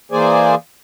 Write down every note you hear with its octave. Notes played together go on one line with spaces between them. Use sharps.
E3 A#3 G#4 C5 D5 G#5